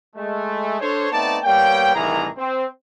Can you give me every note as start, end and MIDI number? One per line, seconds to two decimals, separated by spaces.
0.15 0.77 56
0.15 0.77 57
0.80 1.07 62
0.80 1.07 69
0.80 1.07 72
0.80 1.07 73
1.12 1.37 57
1.12 1.37 59
1.12 1.37 60
1.12 1.37 63
1.12 1.37 74
1.12 1.37 81
1.43 1.94 55
1.43 1.94 58
1.43 1.94 59
1.43 1.94 73
1.43 1.94 79
1.94 2.26 36
1.94 2.26 45
1.94 2.26 51
1.94 2.26 52
1.94 2.26 68
1.94 2.26 82
2.37 2.65 60